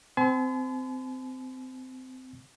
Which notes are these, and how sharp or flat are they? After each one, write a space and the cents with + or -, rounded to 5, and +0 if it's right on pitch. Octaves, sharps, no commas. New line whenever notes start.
C4 -20 G#5 +45 C6 -45